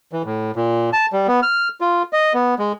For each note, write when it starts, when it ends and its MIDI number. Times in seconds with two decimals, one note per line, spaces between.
0.13 0.22 52
0.25 0.51 45
0.56 0.90 46
0.93 1.06 81
1.13 1.27 55
1.27 1.40 59
1.42 1.69 89
1.81 2.03 65
2.13 2.33 75
2.34 2.55 59
2.59 2.73 56